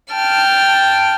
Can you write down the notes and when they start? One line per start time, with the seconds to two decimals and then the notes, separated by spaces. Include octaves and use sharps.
0.14 G5 A5 F6